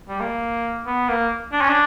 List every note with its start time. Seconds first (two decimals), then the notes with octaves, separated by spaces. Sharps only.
0.08 G3
0.20 A#3
0.86 B3
1.08 A#3
1.53 D4
1.61 C#4
1.69 D4